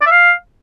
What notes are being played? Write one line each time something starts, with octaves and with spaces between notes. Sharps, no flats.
D5
E5
F5